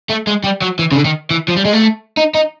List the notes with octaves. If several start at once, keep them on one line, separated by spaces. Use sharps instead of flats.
A3
G#3
G3
F#3
E3
C#3
D3
D#3
E3
F3
G3
G#3
A3
D#4
D#4